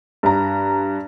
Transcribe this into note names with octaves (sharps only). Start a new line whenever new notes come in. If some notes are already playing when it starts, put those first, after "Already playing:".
G2 A#5